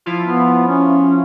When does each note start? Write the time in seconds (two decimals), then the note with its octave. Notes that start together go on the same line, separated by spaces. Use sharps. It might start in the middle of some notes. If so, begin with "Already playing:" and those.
0.06 F3 E4 F4
0.23 B3
0.68 C#4